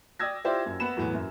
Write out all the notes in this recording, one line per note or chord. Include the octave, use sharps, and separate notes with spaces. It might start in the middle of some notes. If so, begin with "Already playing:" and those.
D5 G5 D#6 E6 G#6 A#6
E4 F4 G4 C5 D5 E5
F#2
B3 F#5 B5 E7
E2 A2 E3 F#3 B3
F#2